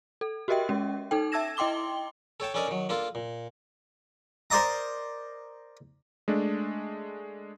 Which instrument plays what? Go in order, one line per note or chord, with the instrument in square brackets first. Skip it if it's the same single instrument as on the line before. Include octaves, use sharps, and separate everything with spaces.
[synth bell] A4
F#4 G4 A#4 D#5 E5 G5
G#3 C#4
D#4 A4 G5
E5 A5 E6 G#6 A#6 E7
E4 D#5 G5 C6 D6 G7
[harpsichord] A4 C#5 G5 A5
C#4 D4 A4 A#4 D5 D#5
D#3 F#3
A#3 D4 F4 A4 A#4
A#2
A#4 C5 D5 D#5 A#5
[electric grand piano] G#3 A3 D4